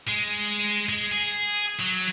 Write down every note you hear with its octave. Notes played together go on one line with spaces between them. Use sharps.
G#3
G#3
G#4
F#3